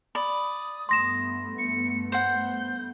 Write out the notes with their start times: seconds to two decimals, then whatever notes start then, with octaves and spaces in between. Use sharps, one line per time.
0.15 D5 B5 D#6
0.89 G2 A3 B3 C6 A#6 E7
1.58 C#7
2.12 C5 F#5 G6